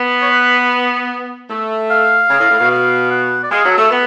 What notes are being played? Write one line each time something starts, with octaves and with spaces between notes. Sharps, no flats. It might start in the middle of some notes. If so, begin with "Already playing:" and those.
Already playing: B3
C#5
B4
A3
F5
C#3
A2
A2
B2
F5
F#5
D5
G#3 F5
F#3
A4
A3
B3